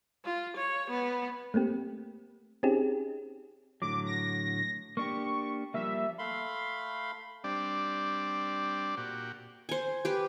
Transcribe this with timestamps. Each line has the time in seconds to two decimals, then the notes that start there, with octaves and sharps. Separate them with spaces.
0.25 F4
0.57 C#5
0.90 B3
1.54 A3 A#3 C4 G4
2.63 C4 C#4 D#4 G4 G#4
3.82 A2 D3 F#3 D6
4.06 A#6
4.97 A#3 D4 G4 C#6
5.74 F3 G3 A#3 E5
6.19 A3 F5 B5 C6
7.44 G3 C4 D4 D5
8.97 A#2 F#4 G4
9.69 C5 G#5
10.05 G4 B4